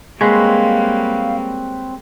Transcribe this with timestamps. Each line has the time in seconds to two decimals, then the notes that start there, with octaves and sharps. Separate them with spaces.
0.21 G3 G#3 A#3 C4 B4 C#5 F5